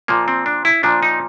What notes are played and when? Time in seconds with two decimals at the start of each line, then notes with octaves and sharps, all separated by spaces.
0.08 A#2 F3 A#3
0.28 C4
0.46 D4
0.65 E4
0.83 A#2 F3 D4
1.03 D#4